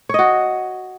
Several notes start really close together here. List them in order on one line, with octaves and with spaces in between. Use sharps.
C#5 D#5 F#4